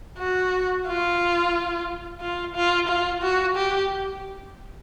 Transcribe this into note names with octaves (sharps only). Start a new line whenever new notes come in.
F#4
F4
F4
F4
F4
F#4
G4